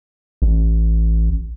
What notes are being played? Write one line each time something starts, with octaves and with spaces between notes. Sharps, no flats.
A1